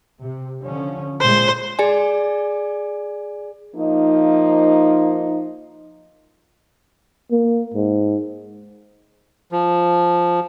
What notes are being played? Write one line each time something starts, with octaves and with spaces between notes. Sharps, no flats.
C3
D3 F3 C#4
A#2 G#3 C5
G#4 D5 G#5
F3 A#3 D#4
A#3
G#2
F3